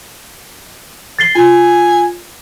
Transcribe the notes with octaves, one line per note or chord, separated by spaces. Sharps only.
A6 C7 G7
F4 G#5